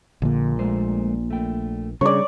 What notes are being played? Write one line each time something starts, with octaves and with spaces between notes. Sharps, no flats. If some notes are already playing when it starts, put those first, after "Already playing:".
A#1 A#2 D3
G#3 A3 C5
A3 G5
C#3 G3 D4 G#4 C#5 D5